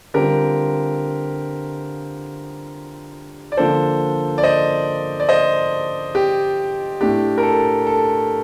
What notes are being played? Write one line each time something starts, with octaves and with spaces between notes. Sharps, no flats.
D3 G3 C4 F4 G4 A#4
D5
D3 F3 A#3 D4 A4 C5
D5
C5 D#5
D5
C5 D#5
G4
A2 A3 D4 G4
A#4
A4
A4